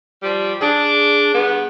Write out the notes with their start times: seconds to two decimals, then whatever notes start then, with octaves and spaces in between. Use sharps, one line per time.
0.22 F3 G3
0.61 D4 G#4
1.33 G2 B3